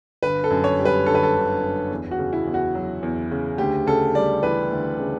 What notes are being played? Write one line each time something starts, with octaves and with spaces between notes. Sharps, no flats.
G1 B4
A4
F#2
C#5
G3
B4
D3 A4
B4
A4
G1
F#2
E2
F#4
C#3
E4
E2
F#4
F#3
E2
C#3
D2 G4
C#3 A4
G3 D5
E3 B4
D2
C#3